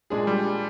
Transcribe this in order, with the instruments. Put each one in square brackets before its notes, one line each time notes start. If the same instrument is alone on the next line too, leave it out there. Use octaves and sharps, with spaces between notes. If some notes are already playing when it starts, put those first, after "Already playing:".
[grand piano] A#2 G#3 D4 G#4
[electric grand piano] G3